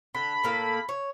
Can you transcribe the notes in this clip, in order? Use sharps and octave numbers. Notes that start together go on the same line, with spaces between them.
D3 B5
A2 A#3 A4
C#5